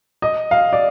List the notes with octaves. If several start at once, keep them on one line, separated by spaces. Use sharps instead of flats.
D#5
F5
D5